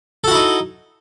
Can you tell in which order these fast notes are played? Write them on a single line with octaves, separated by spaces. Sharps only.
A4 F#4 E4 D#4